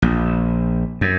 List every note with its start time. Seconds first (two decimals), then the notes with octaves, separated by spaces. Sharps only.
0.02 A#1
1.01 F#2